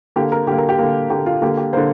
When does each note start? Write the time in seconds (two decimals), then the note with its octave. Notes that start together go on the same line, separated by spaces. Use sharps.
0.16 D3 A#3 G4
0.32 A#4
0.47 D3 A#3 G4
0.58 A#4
0.69 G4
0.79 D3 A#3
1.10 D3 A#3 G4
1.26 F4
1.41 D3 A#3 G4
1.57 G4
1.73 D3 A#3 C5